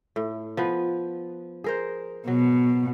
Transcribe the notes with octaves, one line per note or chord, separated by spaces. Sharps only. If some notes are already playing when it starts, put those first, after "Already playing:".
A2
F3 B3 B4
G#4 A#4 C5
B2 F#3